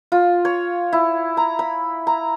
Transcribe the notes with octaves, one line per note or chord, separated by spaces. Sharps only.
F4
C#5
E4
A#5
B5
A#5